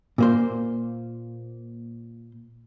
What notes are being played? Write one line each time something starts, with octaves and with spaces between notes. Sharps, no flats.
A#2 A#3 C5